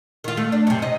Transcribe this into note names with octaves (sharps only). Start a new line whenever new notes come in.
D#3 F4
A3
D4
F#2 C3
C3 D#5